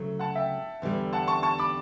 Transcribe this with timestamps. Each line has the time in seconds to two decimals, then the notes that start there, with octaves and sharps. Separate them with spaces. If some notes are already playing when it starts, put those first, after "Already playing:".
Already playing: D2 C#3 F#3 A3
0.19 F#5 A5
0.35 E5 G5
0.82 E2 D3 G3
1.13 F#5 A5
1.27 A5 C#6
1.43 A5 C#6
1.59 B5 D6